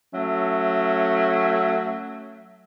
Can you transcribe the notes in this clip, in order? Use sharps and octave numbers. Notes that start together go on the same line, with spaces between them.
F#3 A3 C#4 E5